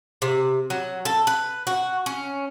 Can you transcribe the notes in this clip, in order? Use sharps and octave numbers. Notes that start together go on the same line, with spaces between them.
C3
F#3
A4
B4
F#4
C#4